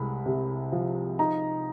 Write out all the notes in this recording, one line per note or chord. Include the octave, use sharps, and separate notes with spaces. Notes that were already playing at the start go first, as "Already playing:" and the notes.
Already playing: C2 G#3 B5
C3
F3
D#4 A#5